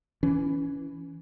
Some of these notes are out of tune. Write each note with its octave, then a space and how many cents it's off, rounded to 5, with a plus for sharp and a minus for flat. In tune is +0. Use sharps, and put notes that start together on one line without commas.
E3 +0 C#4 +20